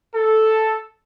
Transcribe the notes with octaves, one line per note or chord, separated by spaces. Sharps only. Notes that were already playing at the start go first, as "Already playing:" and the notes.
A4